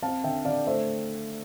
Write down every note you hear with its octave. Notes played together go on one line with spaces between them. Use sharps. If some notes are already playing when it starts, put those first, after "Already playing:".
C4 F5 A5
D3 E5 G5
D3 D5 F5
A3 C5 E5